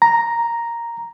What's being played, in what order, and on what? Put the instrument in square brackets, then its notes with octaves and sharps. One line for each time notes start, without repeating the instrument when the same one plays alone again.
[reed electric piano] A#5